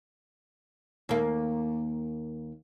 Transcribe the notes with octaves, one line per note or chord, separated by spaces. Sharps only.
D#2 A#3